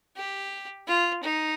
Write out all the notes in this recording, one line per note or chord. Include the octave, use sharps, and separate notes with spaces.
G4
F4
D#4